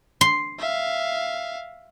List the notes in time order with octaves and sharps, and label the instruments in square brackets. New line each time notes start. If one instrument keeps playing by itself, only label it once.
[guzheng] C6
[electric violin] E5 F5